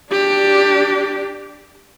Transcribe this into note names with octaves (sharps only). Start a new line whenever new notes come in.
D4 G4